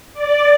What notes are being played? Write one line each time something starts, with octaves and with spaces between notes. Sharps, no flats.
D5